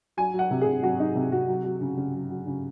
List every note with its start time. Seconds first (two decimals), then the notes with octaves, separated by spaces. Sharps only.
0.17 F#3 G#5
0.34 F#3
0.39 F#5
0.51 C3
0.61 C3 G#4
0.83 F#3 F#4
0.99 F#3 D#4
1.15 C3
1.32 C3 F#4
1.48 F#3
1.65 F#3
1.81 C#3
1.97 C#3
2.14 F#3
2.30 F#3
2.47 C#3